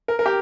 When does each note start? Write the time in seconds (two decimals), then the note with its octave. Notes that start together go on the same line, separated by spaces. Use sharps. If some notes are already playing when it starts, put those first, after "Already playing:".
0.08 A#4
0.19 A#4
0.26 G4